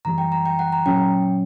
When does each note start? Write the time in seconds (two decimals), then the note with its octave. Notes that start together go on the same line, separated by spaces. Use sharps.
0.05 F#2 E3 G3 A#5
0.18 G5
0.32 A#5
0.46 G5
0.59 F#5
0.72 A#5
0.86 A#2 F#3 C#4 G5